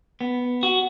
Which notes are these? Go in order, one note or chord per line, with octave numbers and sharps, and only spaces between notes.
B3
F#4